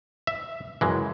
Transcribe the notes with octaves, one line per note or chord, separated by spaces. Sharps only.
E5
F#2 C#3 E3 G#3